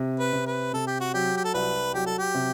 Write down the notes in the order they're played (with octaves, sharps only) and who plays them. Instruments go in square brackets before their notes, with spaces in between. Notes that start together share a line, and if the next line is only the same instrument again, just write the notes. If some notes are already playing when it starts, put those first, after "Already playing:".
Already playing: [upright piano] C3
[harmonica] B4
[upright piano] C3
[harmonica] B4
[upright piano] C3 [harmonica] A4
[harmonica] G4
F#4
[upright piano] F#3 [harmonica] G4
[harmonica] G4
A4
[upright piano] C2 [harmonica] B4
[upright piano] F#3 [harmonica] G4
[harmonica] A4
G4
[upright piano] C3